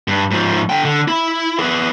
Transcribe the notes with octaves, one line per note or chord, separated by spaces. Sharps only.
G2
G#2 F3
D3 G5
D3
E4
B3 G#4